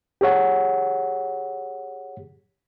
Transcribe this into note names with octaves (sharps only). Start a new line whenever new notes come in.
G4 G#4 C#5 F#5